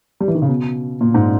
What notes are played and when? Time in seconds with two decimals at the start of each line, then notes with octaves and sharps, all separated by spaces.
0.20 G3
0.28 E3
0.35 D#3
0.42 C#3
0.49 B2
1.01 A#2
1.14 G#2